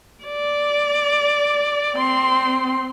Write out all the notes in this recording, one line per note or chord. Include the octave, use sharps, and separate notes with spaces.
D5
C4 C6